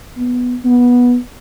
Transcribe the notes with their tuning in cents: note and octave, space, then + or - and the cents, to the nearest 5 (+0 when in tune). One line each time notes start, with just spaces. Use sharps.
B3 +0
B3 -15